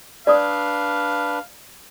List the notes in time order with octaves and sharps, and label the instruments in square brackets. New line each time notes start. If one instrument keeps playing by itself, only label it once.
[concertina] D4 B4 [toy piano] D5 D#6 [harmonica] F5